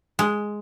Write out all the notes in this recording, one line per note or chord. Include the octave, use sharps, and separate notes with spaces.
G#3